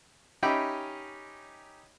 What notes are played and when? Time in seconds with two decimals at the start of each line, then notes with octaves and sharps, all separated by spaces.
0.43 C#4 D#4 G4 E5 G5 B5